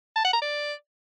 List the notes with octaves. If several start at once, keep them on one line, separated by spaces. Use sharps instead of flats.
A5
F#5
A#5
D5